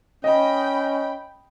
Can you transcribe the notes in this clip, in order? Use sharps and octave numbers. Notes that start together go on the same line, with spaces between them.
C#4 D#5 G5 B5